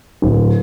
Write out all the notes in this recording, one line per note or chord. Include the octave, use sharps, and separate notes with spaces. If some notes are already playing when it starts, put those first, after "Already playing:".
D1